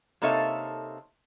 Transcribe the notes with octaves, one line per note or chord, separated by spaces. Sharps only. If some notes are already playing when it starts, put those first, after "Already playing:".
C3 A#3 D#4 A4 C#5 E5